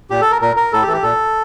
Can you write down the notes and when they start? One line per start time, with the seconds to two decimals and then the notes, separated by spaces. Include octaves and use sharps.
0.10 A#2 G4
0.21 A4
0.31 A#4
0.41 A#2 A#4
0.57 A#4
0.72 A2 A4
0.82 G4
0.87 E3 A4
0.93 G4
1.03 A#2 A4